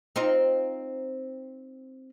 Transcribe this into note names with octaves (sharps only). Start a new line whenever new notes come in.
C4 D#4 F4